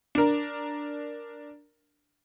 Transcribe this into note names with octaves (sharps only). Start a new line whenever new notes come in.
D4 A#4